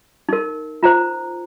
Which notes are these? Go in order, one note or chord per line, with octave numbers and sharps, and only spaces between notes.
D#4 A#4
F4 C5 A#5